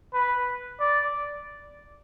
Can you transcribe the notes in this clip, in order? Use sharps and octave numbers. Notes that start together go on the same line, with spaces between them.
B4
D5